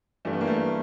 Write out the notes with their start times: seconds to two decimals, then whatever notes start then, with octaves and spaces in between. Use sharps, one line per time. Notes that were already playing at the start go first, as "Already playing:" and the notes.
0.25 G2 E3 G3 A3
0.33 B3
0.41 A#3
0.47 A3